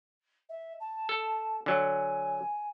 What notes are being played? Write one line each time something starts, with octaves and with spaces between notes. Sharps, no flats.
E5
A5
A4
D3 F#3 G#5